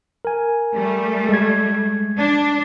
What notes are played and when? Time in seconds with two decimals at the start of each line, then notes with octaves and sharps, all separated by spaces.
0.25 A#4 G#5
0.73 G3 A3
1.29 G#3 G#6
2.18 D4